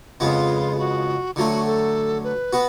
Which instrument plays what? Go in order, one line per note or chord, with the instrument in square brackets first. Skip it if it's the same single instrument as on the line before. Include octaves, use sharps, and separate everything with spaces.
[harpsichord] F2 C#3 G#3 B3 [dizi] F4
[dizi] G#4
F#4
[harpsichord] D3 F#3 A3 [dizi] F4
[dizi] F#4
A4
B4
[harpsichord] B3 F#4